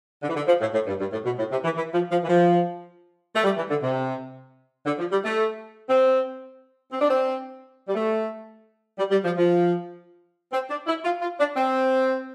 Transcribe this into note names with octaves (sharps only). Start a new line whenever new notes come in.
D3
E3
D3
F3
A2
A2
G2
G2
A2
B2
A2
C3
E3
E3
F3
F3
E3
F3
A3
G3
E3
D3
C3
D3
F3
G3
A3
C4
C4
D4
C4
G3
A3
G3
G3
F3
F3
C4
D4
E4
F4
F4
D4
C4